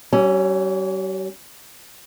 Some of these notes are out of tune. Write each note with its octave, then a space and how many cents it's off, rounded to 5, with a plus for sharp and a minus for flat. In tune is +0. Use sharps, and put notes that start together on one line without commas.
G3 -45 C#4 +0